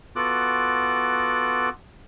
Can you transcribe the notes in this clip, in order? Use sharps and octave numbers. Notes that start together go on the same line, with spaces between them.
B3 F4 F#4 A4 D6 F#6